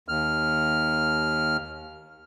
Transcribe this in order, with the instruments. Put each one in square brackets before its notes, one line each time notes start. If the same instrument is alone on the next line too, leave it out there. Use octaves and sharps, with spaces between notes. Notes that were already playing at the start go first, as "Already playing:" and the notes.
[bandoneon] D#2 F6